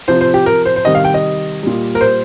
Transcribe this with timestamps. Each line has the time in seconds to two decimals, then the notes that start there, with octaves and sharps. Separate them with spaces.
0.08 C3 F3 C5
0.21 C5
0.34 G4
0.46 A#4
0.65 C5
0.76 C5
0.85 C3 D#3 G3 D#5
0.95 F5
1.05 G5
1.14 D#5
1.63 A#2 G3
1.95 A#4
2.01 C5